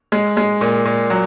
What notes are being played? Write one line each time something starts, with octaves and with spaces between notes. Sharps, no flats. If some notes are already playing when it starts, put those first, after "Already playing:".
G#3
G#3
A#2
A#2
F#3